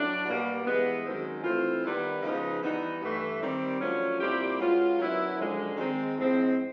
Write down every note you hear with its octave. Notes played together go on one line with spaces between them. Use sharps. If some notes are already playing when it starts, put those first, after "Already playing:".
Already playing: A2 F#3 A3 D4
B2 G3 A#3
G2 E3 G#3 B3
F#2 D#3 G#3 C4
E3 A3 C4 F4
D#3 G3 B3 E4
C#3 F3 G#3 B3 D#4
E3 G3 B3 D#4
G2 E3 A3
D#3 G3 C4
F#2 D3 F3 A3 C#4
A#2 G3 C4 E4 G4
B2 G#3 C#4 F4
F#2 D3 F#3 B3 E4
F#2 D3 F3 G#3
D#3 G#3 C4
A2 F3 G#3 C4